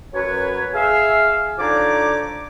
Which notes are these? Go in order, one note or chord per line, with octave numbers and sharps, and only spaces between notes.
F#2 B4 C#5
G#4 E5 F5
D3 F3 D#4 C#5 D5 D6